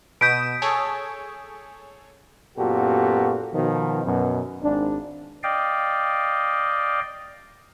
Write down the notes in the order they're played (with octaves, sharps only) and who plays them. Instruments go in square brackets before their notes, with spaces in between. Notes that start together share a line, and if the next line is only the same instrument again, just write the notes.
[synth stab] B2 D#6 E7 [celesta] G6 B6 D7
[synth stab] G#4 A4 C#5
[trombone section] F#2 A#2 B3 F#4 G4 A4
B2 D#3 F3
F#2 B2
G#1 D4
[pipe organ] D5 D#5 F5 G5